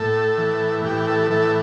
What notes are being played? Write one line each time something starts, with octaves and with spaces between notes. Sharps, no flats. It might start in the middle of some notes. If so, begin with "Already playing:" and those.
Already playing: A2 A4
E3
A2 G4
A4
E3 A4